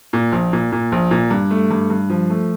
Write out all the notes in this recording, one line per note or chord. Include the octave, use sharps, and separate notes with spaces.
A#2
A#1
A#2
A#2
A#1
A#2
G2
A3
G2
G2
F3
A3